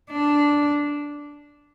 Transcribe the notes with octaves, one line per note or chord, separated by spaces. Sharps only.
D4